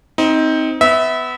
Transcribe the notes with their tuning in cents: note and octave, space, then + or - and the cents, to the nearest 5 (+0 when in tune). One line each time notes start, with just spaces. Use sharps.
C4 +0 D#4 +20
B3 +20 E5 -20